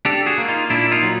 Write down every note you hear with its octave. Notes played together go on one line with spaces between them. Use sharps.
D4 G4 A4
F#4 G#4
A#3
D#4 F4
A#2 D4 E4
D#4 F4
F#3